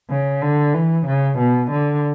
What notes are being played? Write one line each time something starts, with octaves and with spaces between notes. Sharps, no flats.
C#3
D3
E3
C#3
B2
D3